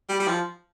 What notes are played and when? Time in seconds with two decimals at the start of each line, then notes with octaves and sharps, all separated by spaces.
0.09 G3
0.20 G3
0.28 F3